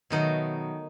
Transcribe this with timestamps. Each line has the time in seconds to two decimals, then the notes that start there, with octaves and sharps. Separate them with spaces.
0.10 B2 D#3 F#3 A3 D#4